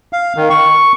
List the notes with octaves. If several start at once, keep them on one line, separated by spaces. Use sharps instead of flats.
F5
D#3
C#6